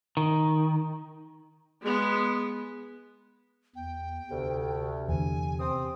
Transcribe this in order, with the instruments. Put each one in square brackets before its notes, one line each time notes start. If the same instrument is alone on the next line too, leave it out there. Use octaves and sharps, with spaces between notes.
[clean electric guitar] D#3
[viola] G#3 B3
[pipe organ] E2 [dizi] G5
[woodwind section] D2 [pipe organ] C3
[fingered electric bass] E2 D3 [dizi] G#5
[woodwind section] C4 [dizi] D#6